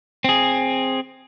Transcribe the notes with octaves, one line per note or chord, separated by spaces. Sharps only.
C4 G#4